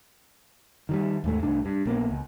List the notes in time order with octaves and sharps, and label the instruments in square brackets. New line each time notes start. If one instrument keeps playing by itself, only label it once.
[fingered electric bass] D#3 F3 G3
D#2 G#2 A3
C2 A2 D4
G2
A#1 A#3 B3
C#2